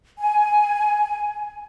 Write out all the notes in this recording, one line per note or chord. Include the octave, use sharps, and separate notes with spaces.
G#5